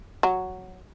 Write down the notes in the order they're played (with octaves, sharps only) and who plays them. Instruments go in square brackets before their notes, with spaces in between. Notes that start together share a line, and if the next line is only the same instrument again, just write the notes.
[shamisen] F#3